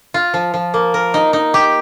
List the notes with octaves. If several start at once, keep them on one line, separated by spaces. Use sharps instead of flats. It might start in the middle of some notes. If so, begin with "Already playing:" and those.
F4
F3
F3
A#3
A#4
D#4
D#4
G4